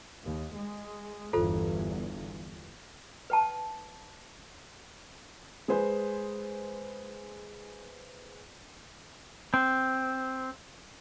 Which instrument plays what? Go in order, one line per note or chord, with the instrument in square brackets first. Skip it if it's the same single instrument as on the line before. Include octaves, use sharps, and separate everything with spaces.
[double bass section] D#2
G#3
[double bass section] G1 E2 G2 [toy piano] F4 A4 C5
[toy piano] B4 G5 A5
[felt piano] G#3 G#4 B4 C5
[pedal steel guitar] C4